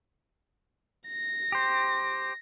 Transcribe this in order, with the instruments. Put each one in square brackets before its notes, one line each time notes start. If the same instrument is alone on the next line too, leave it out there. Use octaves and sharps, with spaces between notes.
[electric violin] A#6
[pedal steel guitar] G4 C5